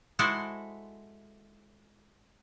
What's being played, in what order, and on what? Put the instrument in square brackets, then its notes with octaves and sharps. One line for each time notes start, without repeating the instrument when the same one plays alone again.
[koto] G#3 E4 F#4 A4 C5